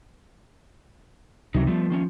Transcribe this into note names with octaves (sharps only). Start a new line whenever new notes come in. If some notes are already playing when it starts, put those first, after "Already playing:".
C#2 C3 E3 F#3 D#4
F3 G3 A3 B3
D#3 A#3 C#4